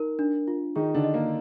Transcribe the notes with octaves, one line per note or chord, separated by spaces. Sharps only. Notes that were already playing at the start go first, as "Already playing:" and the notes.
Already playing: D#4 A#4
D4
F4
D#3 D#4 G#4
D3 D4
D#5
A#3